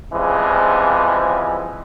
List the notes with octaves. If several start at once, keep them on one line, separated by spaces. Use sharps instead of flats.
C#3 E3 F3 G3 G#3 C4